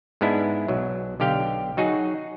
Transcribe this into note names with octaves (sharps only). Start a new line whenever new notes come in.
G#2 G#3 B3 D4 E4
B1 F#3
B1 D3 G4 F5 G5
F#3 D#4 F#4 G#4